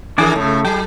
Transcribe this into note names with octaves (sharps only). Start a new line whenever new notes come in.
D#3 D4 G#4 A#4 D5 G#5
A2 C#3 A3
F#3 G#4 G5